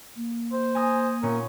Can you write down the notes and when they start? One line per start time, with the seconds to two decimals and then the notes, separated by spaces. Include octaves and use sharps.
0.16 A#3
0.53 C5
0.75 G#5 A#5 D#6
1.23 A#2 B3 C#4 A#4